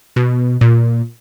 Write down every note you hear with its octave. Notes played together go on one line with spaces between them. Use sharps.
B2
A#2